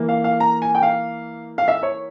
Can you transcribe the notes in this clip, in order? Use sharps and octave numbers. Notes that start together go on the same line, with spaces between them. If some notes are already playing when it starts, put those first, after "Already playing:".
Already playing: E3 A#3
F5
F5
A#5
G#5
G5
F5
F5
E5
C#5